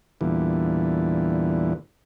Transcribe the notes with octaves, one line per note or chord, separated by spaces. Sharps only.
E2 A#2 D3 E3 G3